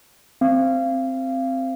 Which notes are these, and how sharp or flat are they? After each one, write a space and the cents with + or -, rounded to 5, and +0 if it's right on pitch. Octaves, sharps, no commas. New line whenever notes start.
C4 +0 F5 -25